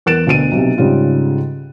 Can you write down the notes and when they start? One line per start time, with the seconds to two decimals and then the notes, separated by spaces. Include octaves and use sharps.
0.06 E2 A#4 F#6 A6 D7 E7
0.27 D2 B2 D7 D#7
0.52 B1 C3
0.78 G#2 C#3 G3 F4